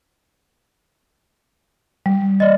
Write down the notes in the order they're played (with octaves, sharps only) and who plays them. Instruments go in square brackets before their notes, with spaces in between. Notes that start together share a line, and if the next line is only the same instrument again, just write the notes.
[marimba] G3
[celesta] D5 D#5